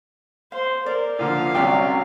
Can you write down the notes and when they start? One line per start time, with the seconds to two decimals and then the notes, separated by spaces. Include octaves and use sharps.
0.52 C5 F5
0.86 A#4 D5
1.19 A#2 D3 F3 F5
1.55 C2 C3 F#3 C#4 D5 G5